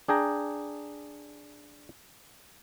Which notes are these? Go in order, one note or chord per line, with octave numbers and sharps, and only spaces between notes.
D4 G#4 G5 A#5